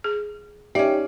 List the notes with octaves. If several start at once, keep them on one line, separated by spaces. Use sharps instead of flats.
G#4
C#4 D#4 G4 D5 E5